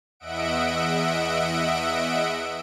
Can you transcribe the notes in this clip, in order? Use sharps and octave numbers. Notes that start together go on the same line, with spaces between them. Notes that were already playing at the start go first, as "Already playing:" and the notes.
E2 D#5 E5 F#5 D7